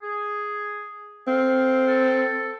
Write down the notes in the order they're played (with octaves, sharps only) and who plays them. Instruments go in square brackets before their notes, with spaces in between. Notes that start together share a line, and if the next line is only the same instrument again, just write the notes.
[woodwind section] G#4
[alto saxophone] C4 [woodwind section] A4 F5
[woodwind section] A4